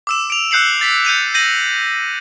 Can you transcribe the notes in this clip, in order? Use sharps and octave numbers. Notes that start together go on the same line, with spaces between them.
D6 E6 E7
D7 F7
E6 F#6 G6 C7 C#7 F#7
A6 B6
G6 C#7 D#7 F7
G6 A#6 D#7 F#7